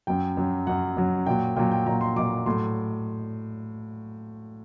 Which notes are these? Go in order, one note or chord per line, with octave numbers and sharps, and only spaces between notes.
F#2 F#3 G5
F#2 F#3
F#2 F#3 F#5
F#2 F#3
A#2 F#3 G5
A#2 F#3 G5
G5
A#2 F#3 A#5
C6
A#2 F#3 D6
A2 F#3 C6